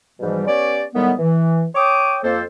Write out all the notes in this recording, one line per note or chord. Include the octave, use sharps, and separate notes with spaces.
G#2 B2 E3 F3 G3
B3 C#4 G4 C#5 D5
A2 D#3 G3 G#3 B3
E3
C#5 G5 D6 D#6
F2 A#3 A4 C5